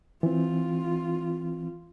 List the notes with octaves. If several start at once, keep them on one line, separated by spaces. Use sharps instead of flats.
E3 C4 F4